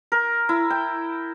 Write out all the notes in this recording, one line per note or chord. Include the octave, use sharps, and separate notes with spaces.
A#4
E4
G5